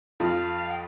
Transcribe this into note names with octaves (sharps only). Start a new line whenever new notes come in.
F2 F3 F5
G5